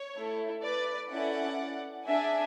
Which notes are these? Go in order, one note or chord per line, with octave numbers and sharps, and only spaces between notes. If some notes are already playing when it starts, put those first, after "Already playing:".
Already playing: C#5
A3 E4 A4
B4 D5
C#4 E4 A4 D5 F#5
D4 G#4 E5 G#5